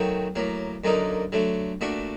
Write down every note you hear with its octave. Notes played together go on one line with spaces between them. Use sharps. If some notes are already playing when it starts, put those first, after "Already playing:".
Already playing: D#3 F#3 A3 C4 F#4
A2 F#3 A#3
F#2 D3 F#3 A#3 D#4
D3 F#3 A3
A#2 A3 D4 F#4